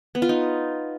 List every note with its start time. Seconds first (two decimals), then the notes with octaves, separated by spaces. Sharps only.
0.15 B3
0.22 F4
0.29 D#4